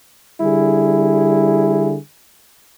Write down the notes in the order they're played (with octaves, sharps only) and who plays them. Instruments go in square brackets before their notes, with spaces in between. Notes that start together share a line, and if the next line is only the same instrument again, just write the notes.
[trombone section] D3 G3 E4 G#4